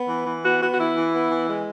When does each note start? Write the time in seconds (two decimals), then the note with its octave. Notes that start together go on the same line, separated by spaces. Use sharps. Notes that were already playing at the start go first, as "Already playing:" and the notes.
Already playing: B3
0.09 E3
0.26 E3
0.44 B3 F#4
0.61 B3 F#4
0.71 F#4
0.78 E3 E4
0.95 E3
1.13 B3
1.30 E3
1.48 G#3